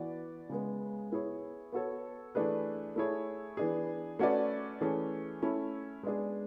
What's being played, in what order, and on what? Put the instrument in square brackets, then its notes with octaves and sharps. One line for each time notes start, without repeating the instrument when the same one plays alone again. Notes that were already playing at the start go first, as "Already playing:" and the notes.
Already playing: [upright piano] E3 B3 F#4 B4 D5
C#3 G#3 B3
B3 E4 G#4 C#5
B3 F#4 A4 C#5
E3 A3 D4 G#4 B4
A3 E4 G#4 C#5
E3 B3 D4 G#4
A3 C#4 F#4 B4 D5
E3 A3 C#4 G#4
A3 C#4 E4
G#3 B3 D4 G#4